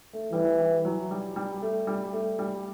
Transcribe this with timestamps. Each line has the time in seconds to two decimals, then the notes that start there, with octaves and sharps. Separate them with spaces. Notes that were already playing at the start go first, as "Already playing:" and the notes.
0.13 A3
0.32 E3 G3
0.59 G3
0.85 F#3
1.11 G3
1.36 G3
1.62 A3
1.87 G3
2.13 A3
2.39 G3